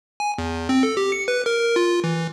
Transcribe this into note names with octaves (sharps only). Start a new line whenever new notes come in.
G#5
E2
C4
A4
G4
C#7
B4
A#4
F4
E3